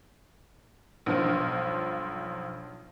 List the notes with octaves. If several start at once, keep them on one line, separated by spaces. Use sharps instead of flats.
B1 G2 F3 C5 F6